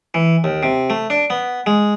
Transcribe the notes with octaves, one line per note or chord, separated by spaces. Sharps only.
E3
D#2
C3
A3
D4
B3
G#3